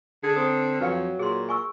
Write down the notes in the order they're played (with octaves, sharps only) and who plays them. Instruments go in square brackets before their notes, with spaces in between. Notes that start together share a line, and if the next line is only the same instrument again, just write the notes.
[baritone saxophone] D3 [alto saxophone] G#4
[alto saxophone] C4 [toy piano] A#5 D#6
[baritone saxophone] F2 [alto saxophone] F#3 [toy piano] B4 F5 G5
[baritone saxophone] A#2 [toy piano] G#4 C6
[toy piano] G#5 C#6 E6